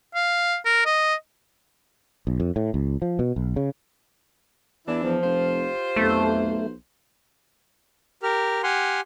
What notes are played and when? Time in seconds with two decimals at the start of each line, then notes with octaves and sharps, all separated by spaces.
0.15 F5
0.65 A#4
0.86 D#5
2.27 B1
2.40 F2
2.56 A2
2.74 C#2
3.02 F3
3.19 B2
3.36 B1
3.56 C#3
4.87 E2 E3 D4 E4
5.03 E2 F3
5.23 F1 F4 G4 C5
5.96 B1 F2 A3
8.23 G4 A#4 F6
8.63 G4 F#5 G#5 C6 F6